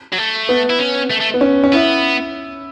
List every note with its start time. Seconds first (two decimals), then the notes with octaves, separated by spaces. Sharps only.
0.13 F#3
0.18 A3
0.49 B3
0.70 E4
0.79 C#4
1.11 A3
1.21 A3
1.34 B3
1.41 C#4
1.64 C#4
1.73 B3 E4